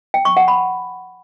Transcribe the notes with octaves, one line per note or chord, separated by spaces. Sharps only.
G5
C#6
F#5
B5